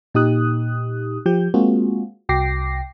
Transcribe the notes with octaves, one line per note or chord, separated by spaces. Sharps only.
A#2 D#4 G4 D#6 F#6
F3 G4 G6
G#3 A#3 C4 F4 F#4 G#4
C2 F#4 G5 D6 A#6 C7